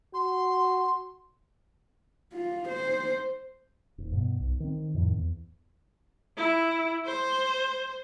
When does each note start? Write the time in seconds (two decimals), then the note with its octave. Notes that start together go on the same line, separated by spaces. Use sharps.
0.14 F#4 C6
2.34 F4
2.69 C5
3.98 D#1
4.12 G2 B2 B3
4.40 B1
4.60 D#3 C4
4.94 F2 A2 D#3 F3
5.14 E2
6.38 E4
7.06 C5